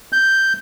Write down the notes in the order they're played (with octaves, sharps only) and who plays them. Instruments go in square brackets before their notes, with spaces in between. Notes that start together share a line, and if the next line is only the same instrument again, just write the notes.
[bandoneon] G6